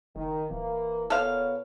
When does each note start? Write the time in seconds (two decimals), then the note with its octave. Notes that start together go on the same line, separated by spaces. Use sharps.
0.16 F#1 D#3
0.50 D1 E3 A#3
1.10 A#2 B3 A4 C#5 F5